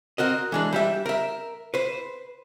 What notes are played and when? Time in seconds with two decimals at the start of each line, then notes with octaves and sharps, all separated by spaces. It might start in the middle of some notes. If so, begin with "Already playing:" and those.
0.18 C4 F#4 A#4 D#5
0.52 E3 G#3 D4
0.73 G3 G4 E5
1.06 A#4 E5
1.74 B4 C5